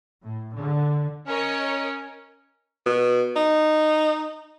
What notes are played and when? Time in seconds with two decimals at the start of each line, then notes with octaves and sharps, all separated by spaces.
0.24 A2
0.57 D3
1.27 C#4 A#4 C#5 D#5
2.86 B2
3.36 D#4